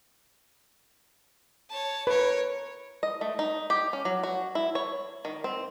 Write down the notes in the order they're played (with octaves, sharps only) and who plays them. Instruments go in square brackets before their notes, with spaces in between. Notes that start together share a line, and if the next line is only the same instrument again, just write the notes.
[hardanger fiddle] C#5 A5
[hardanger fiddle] A#4 C#5 [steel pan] B4
[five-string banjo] D#5
A3
D#4
G4
C#4
F#3
F#4
E4
C#5
D#3
C4